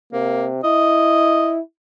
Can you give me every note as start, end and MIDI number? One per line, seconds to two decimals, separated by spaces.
0.13 0.62 48
0.13 0.47 58
0.64 1.60 64
0.64 1.54 75